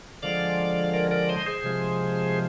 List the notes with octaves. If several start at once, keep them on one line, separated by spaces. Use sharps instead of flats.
D3 F3 G#3 D5 F5
A#4 D5
A#4 D5
C5 D#5
G#4 C5
C3 F3 G#3